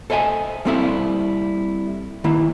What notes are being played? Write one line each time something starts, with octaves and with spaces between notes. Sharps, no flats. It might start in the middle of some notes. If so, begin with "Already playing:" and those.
A4 C5 D#5 E5 G#5
G3 A#3 C4 E4 A4 E5
D#3 A#3 E4